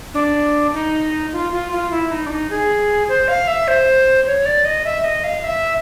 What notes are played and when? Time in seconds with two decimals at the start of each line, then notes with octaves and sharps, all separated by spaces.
0.14 D4
0.74 D#4
1.33 F4
1.53 F4
1.72 F4
1.91 E4
2.11 D#4
2.26 D4
2.30 D#4
2.51 G#4
3.09 C5
3.28 F5
3.48 E5
3.68 C5
4.26 C#5
4.46 D5
4.65 D#5
4.85 E5
5.04 D#5
5.24 F5
5.44 E5